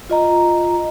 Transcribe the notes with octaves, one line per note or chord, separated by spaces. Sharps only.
F4 D#5 A#5